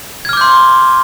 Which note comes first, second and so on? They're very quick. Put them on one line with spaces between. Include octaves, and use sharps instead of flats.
G#6 F6 D6 G6 C6